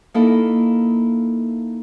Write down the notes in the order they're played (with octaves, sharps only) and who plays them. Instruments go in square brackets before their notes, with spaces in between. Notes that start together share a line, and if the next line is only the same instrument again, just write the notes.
[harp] A#3 D#4 E4 A4